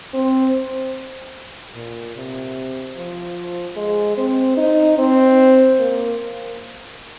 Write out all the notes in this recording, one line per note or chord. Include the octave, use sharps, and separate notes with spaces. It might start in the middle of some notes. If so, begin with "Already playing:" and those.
C4
A#2
C3
F3
G#3
C4
D#4
C4
A#3